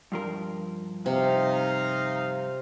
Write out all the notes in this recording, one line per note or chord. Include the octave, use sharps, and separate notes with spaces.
G2 F3 A#4
C3 D#4 F5